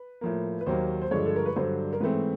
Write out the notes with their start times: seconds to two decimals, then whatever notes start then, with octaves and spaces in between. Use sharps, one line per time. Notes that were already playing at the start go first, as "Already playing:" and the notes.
Already playing: B4
0.21 A2 F3 A#3
0.61 B4
0.66 D#2 D#3 F#3 A#3 C5
1.02 C5
1.11 G2 D3 F3 G#3 C#5
1.26 A4
1.36 A#4
1.46 B4
1.56 G2 D3 F#3 C5
1.93 A#4
2.00 G#2 E3 A3 C4 B4